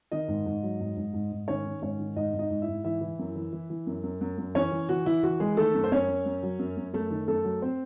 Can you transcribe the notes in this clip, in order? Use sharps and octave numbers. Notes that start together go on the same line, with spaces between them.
D#3 D#4 D#5
G#2
G#2
F#3
G#2
G#2
G#2
G#2
D#3 C#4 C#5
D#3
G#2 C#4 C#5
D#3
G#2 D#4 D#5
G#2
D#4 D#5
G#2
E4 E5
G#2
E3 E4 E5
E3
F#2
E3
E3
E3
F#2
F#2
F#2
F#2
E3 C#4 C#5
E3
E3 F#4
E3 E4
E3 F#4
E3 G#3 G#4
D#3 A3 A4
F#2
C5
F#2 C#4 C#5
F#2
F#2
F#3
F#2
F#2
F#2 A3 A4
D#3
F#2 A3 A4
F#3
C4 C5